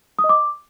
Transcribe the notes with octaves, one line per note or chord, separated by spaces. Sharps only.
D#6
D#5
D6